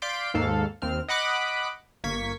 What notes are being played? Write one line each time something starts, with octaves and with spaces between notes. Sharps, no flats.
D5 F5 C6 G6 B6 D7
D#2 G#2 A4 F5
D#2 C4 F6
D#5 F#5 B5 D6 F#6
G1 A#3 C#6 G#6 B6